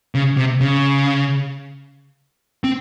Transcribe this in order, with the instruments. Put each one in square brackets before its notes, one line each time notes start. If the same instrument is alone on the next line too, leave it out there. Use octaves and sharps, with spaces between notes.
[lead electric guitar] C#3
C3
C#3
C4